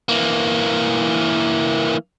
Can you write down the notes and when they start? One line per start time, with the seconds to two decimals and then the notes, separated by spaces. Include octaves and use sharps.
0.09 E3 A#3